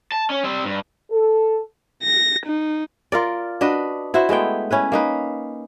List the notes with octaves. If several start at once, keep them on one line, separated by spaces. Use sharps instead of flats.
A5
C#4
G3 C4
G2
A4
A#6
D#4
F4 A#4 D5
D4 F#4 B4 D#5
E4 F#4 C5 E5
G#3 A3 B3 G5
C#4 E4 B4
A#3 D#4 B4